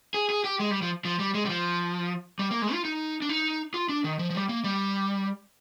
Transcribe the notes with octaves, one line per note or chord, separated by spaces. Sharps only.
G#4
G#4
G4
G#3
G3
F3
F3
G3
G#3
G3
F3
G3
A#3
G#3
F4
D#4
D4
D#4
F4
D4
D#3
F3
F3
G3
A#3
G3